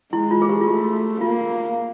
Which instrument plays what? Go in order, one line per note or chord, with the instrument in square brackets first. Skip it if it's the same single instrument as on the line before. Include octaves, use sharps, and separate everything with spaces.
[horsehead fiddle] G#3 [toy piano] E4
[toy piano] F4
G#4
G4
F4
[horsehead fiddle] A3 [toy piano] F#4
[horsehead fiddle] A#3 [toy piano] F4